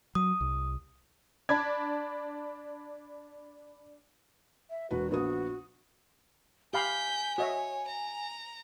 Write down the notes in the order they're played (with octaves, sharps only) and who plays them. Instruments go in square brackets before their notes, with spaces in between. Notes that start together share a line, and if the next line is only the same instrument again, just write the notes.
[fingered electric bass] F#3 [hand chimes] D#6
[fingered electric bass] C2
[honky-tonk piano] D4 [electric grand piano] A5 B5 G#6
[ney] E5
[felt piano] E1 B4 [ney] F#4
[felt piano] A#1 B3 D#6 [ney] F#4
[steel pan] G4 F5 B5 [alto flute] G#5 [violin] G6 B6
[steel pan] F#4 D#5 E5 [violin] C#5
[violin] A#5